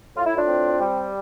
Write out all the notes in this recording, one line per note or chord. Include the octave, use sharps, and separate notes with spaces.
A2 F4
E4
D4 F4
C4
G3